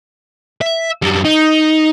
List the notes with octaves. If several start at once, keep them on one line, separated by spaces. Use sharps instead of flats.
E5
F#2 G3
D#4